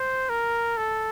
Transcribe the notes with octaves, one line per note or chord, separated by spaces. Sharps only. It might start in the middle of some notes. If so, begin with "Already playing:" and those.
Already playing: C5
A#4
A4